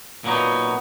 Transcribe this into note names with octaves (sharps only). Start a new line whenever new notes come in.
A#2 F#3 B3 D#4